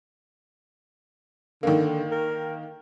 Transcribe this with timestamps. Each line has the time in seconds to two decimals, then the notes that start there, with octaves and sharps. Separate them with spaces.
1.63 D3 D#3 A#3
2.12 A#4